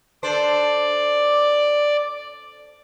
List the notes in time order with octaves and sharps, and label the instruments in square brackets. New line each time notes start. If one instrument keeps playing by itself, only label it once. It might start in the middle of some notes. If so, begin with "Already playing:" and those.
[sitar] D4 A4 C5 [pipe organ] D5